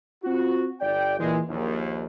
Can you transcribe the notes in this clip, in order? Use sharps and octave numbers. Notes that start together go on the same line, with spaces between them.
C4 F4 F#4
G1 D5 G5
A#2 E3 G#3
A#1 D#2